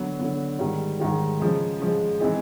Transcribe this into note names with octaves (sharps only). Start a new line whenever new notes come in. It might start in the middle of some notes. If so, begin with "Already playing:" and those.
Already playing: D3 F#3 B3
D3 F#3 B3
G#2 D#3 G3
G#2 D#3 G3
C#3 F3 G#3
C#3 F3 G#3
E3 G#3 C4 D#4 G#4